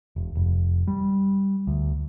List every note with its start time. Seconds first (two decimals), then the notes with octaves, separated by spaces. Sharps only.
0.16 E1
0.35 F1
0.87 G3
1.67 D2